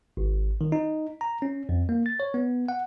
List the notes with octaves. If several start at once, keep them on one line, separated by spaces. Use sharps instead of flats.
G#1
D#3
D#4
A#5
C#4
F2
A#3
A6
C#5
B3
F#5